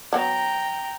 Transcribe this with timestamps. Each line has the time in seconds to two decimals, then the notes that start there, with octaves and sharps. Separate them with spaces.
0.13 F#3 B3 G5 A#5